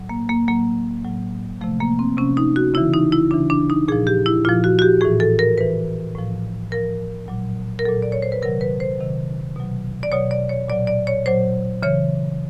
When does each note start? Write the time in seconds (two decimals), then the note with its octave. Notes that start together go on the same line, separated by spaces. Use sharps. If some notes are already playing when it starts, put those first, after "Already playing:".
Already playing: A2 F#3
0.09 A#3
0.29 A#3
0.48 A2 F#3 A#3
1.04 A2 F#3
1.61 C3 F3 A3
1.80 A#3
1.99 C4
2.17 C3 C#4
2.21 F3
2.37 D#4
2.56 F#4
2.74 C#3 E4
2.77 E3
2.94 D#4
3.12 E4
3.31 C#3 E3 D4
3.50 D4
3.70 D#4
3.88 A#2 G#4
3.92 F3
4.07 G4
4.26 E4
4.45 A#2 F3 F4
4.64 F#4
4.79 F#4
4.82 G4
5.01 A2 E3 G#4
5.20 A4
5.39 A#4
5.58 A2 E3 B4
6.15 A2 F3
6.72 A2 F3 A#4
7.28 A#2 F#3
7.79 A#4
7.85 A#2 F#3 A4
8.02 D5
8.12 C#5
8.22 C5
8.32 B4
8.42 C3 D#3 F#3 A#4
8.61 B4
8.80 C5
8.98 C3 D#3 F#3
9.56 B2 F#3
10.03 D5
10.12 B2 F#3 C#5
10.31 D5
10.49 C#5
10.68 A#2 F#3 D5
10.87 D5
11.07 C#5
11.26 A#2 F#3 C5
11.83 C#3 E3 C#5